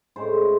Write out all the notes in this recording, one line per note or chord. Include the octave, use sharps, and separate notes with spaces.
A2 G#3 C#4 C5